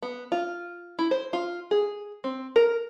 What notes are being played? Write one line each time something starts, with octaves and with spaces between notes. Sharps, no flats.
B3
F4
E4
C5
F4
G#4
C4
A#4